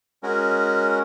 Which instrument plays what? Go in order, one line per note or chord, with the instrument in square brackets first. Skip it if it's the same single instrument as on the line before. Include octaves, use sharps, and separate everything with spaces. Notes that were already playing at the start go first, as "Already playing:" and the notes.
[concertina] G#3 C#4 F#4 A#4